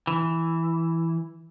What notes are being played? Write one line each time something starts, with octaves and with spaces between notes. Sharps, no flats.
E3